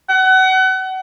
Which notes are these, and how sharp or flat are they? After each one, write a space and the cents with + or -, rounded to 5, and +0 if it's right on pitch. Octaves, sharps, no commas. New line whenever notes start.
F#5 +30